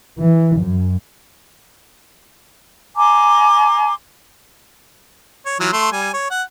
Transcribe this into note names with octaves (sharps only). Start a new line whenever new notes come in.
E3
F#2
G#5 A#5 C6 D6
C#5
E3 F#3 F4
A3 C6
G3 G#5
C#5
F#5